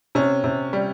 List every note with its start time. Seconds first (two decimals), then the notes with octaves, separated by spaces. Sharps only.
0.15 C3 C#4
0.44 C3
0.73 G3